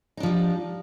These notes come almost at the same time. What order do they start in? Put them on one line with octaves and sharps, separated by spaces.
D#4 D4 F3 G3